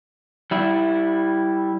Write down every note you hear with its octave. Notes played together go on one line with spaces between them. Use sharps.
G3 E4